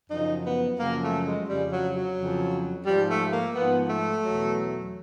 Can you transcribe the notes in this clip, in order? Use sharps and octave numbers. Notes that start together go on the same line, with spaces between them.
F#2 C#3 F3 D#4
B3
F#2 C#3 F3 A#3
A3
G#3
F2 C#3 F3 G3
F#3
F#3
F2 C#3 F3
G#2 F3 G3
A3
A#3
G#2 F3 B3
A3
E2 B2 F#3